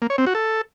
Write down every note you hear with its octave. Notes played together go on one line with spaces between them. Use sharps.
A#3
C#5
C4
F#4
A4